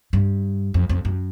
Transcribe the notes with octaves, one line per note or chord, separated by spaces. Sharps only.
G2
F2
F2
F#2